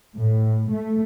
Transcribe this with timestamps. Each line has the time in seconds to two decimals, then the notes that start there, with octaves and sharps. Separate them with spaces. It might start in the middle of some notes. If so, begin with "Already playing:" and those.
0.16 A2
0.71 A3